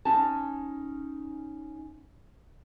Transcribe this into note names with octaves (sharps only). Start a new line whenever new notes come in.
C#4 D#4 G#5 A5